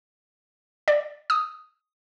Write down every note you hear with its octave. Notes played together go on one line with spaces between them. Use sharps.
D5
D#6